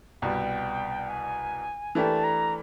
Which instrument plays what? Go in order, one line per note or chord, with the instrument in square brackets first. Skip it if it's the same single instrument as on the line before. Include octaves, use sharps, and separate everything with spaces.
[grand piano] C2 B2 G3 [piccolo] G5
[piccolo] G#5
[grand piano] E3 A3 D4 G4 A#4 [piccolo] A5
[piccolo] A#5